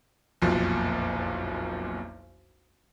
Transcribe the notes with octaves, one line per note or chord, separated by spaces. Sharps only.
F#1 B1 F2 A#2